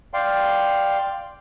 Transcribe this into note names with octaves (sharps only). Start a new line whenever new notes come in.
D5 F5 G5 C6